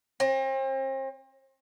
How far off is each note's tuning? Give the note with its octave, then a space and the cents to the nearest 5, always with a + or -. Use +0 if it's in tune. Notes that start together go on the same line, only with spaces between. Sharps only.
C4 +40